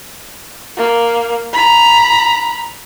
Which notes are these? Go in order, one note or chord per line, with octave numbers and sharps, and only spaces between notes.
A#3
A#5 B5